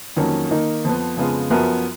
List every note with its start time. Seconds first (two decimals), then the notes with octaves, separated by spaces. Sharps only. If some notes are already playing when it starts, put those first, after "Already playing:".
0.16 F2 D#3 F#3 A#3 C#4
0.51 D#3 A#3 D#4
0.84 F2 F3 B3
1.17 F2 C#3 G#3 B3 F4
1.50 F#2 F3 B3 F#4 A#4